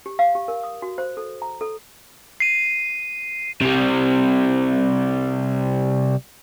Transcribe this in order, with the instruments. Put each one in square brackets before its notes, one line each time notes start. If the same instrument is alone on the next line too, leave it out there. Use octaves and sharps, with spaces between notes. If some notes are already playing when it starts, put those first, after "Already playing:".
[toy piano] G4
F5
G4
A#4
D#6
F#4
C5
A4
A#5
A4
[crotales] C7 D#7
[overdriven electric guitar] C3 G3